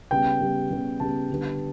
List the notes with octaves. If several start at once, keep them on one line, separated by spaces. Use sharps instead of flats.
C#3 G3 B3 G5
C#3 G3 B3
C#3 G3 B3
C#3 G3 B3 A5
D3 G3 B3